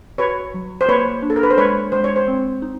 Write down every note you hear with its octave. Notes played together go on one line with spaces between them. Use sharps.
F#4 B4 C#5
F#3
C5
A#3 B4 C#5
D4
A4
A#4
B4
C5
G#3 B4 C#5
G#3 C5
C#5
C5
C4
D#4